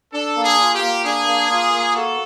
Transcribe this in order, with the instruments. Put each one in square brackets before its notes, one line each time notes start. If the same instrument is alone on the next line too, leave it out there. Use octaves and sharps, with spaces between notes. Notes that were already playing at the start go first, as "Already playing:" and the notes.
[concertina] D4 [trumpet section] A4
[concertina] A#3
[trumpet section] G#4
[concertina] F4
[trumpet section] G4
[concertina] A#3
[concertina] D4 [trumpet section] G#4
[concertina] A#3
F4
A#3
[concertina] F#4 [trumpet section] A4